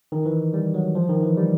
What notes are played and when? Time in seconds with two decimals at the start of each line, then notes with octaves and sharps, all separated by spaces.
0.12 D#3
0.25 E3
0.54 G3
0.74 F#3
0.95 F3
1.09 D#3
1.23 E3
1.37 G3